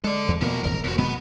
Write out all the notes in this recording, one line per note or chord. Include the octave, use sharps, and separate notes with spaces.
G#3 A4 D5
E2
B2 F3 A#3 A#4
D#1 G#1 E2 A#4
F1 E2 F#4
B2 D#3 G#3 B3